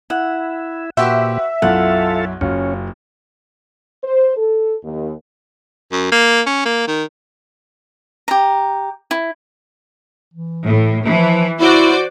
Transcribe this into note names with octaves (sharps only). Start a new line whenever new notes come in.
E4 F#5
A#2 F#4 G4 B4 C5 E5 F#5
B1 F#2 E4 F4 A4 F#5
F#1 F#3 C#4 F4
C5
A4
D#2
F#2
A#3
C#4
A#3
D#3
G4 A#5
E4
E3
A2
E3 F3
E4 F#4 C5 D5